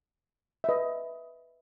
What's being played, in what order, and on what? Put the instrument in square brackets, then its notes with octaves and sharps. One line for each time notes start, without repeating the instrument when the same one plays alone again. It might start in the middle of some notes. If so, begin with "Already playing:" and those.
[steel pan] E5
B4 D#5